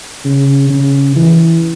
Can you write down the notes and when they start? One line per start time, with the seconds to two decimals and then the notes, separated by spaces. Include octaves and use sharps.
0.25 C#3
0.70 C#3
1.16 E3